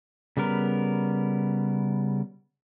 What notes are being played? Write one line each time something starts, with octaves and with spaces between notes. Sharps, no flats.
C#3 G3 B3 A#4